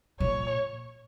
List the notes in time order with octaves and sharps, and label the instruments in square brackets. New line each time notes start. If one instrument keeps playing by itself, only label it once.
[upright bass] A#2 [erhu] C#5